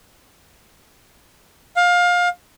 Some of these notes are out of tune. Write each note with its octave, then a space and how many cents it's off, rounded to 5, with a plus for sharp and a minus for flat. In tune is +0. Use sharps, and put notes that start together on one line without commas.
F5 +25